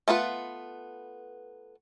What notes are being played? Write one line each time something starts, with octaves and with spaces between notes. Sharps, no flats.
A3 B3 F4 B4